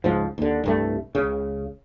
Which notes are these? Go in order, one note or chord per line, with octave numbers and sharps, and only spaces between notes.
C#2 G#2 F3
D#2 D3
C2 G2 A3
C#2 C#3